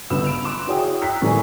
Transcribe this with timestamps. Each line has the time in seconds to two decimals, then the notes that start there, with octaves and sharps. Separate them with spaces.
0.10 G1 C#2 B3 B5 E6 E7
0.24 B5 D7 F7
0.45 C6 D6 F#6 E7
0.67 E4 F#4 G#4 C#5 G5 D#6
1.01 G5 A#5 E6 F#6 B6 C7
1.22 A2 E3 G3 A3 A#4 G#5